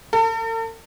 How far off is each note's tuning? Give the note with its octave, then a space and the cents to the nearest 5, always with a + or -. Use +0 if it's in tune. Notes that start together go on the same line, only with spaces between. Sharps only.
A4 +45